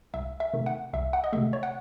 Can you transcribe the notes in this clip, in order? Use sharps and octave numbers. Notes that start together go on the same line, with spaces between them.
C2 E5
E5
C3 D#3 A3
F#5
C2 E5
F#5
D#5
C3 D#3 A3 E5
C#5
F#5